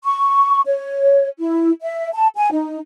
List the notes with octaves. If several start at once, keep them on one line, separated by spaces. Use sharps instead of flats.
C#6
C#5
E4
E5
A5
G#5
D#4